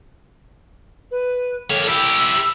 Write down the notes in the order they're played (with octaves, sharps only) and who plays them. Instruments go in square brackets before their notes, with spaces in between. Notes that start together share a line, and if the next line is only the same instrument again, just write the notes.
[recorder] B4
[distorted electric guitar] A#3 C#5 [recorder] A4
[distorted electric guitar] E4 G4 [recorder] E6